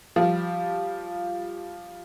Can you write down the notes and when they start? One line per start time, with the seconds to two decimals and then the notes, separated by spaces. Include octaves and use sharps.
0.16 F3 G3